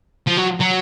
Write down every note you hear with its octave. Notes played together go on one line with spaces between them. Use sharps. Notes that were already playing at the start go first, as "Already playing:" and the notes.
F3
F#3
F#3